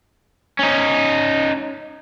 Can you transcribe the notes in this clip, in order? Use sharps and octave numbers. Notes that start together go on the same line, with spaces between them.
C#4 D#4